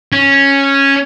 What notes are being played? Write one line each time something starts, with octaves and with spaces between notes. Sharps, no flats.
C#4